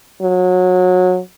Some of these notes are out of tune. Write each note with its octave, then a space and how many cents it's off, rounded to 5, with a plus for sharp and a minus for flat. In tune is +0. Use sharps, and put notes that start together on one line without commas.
F#3 -25